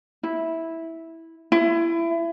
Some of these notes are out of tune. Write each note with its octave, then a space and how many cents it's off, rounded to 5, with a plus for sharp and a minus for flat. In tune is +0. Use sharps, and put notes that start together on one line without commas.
E4 -10
E4 +25